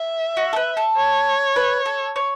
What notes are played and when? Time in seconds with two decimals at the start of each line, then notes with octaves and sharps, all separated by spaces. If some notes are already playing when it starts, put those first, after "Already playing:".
Already playing: E5
0.37 F#4
0.53 A4
0.56 B4
0.77 A4
0.96 C#5
1.56 B4
1.86 A4
2.16 C#5